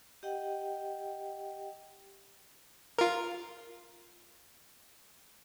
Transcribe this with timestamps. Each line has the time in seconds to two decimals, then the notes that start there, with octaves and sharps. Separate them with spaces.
0.23 G4 D#5 F#5 G5
2.98 F4 A#4